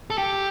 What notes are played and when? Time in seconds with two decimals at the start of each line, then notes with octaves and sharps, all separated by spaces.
0.10 A4
0.18 G4